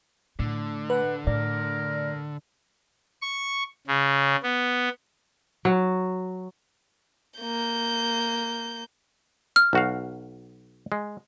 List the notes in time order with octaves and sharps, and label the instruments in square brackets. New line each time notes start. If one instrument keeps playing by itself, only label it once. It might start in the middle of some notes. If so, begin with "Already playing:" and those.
[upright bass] A2 [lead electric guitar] D3
[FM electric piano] B4 [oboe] F#5
[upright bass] A2 [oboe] A#4 [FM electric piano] D5
[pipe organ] C#6
C#3
B3
[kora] F#3
[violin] A#3 G6
[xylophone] F6
[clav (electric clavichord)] B1 F#4 F5
G#3